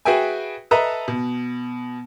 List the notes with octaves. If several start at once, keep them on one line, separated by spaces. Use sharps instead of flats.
F#4 G#4 B4 E5 G5 G#5
A4 B4 D#5 E5 A5 A#5
B2